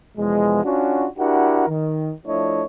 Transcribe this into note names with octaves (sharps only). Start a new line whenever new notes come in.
E2 B2 F3 G#3
C#4 D4 F4 F#4
D4 E4 F#4 G4 A#4 F#5
D#3
F3 A3 D4 E4 C#5 D#5